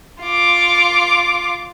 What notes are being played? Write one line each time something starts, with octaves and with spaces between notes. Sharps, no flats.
F4 D6